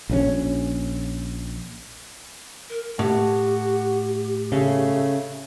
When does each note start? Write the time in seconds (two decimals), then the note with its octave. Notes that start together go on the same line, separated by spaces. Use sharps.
0.09 A#1 C#3 C#4
2.70 A#4
2.99 A2 F#4 G4
4.52 C#3 A3